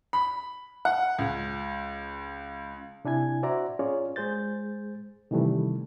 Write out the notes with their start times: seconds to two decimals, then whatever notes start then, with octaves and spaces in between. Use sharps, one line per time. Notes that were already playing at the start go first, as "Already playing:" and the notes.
0.13 B5
0.85 F#5
1.18 C#2
3.05 C3 D4 E4 G#5 G#6
3.43 F#4 C5 D5 E5 F#5 A#5
3.79 C#4 F4 G#4 C#5 D5
4.16 G#3 G#4 C5 G6 A6
5.31 C3 D#3 E3 G3 A3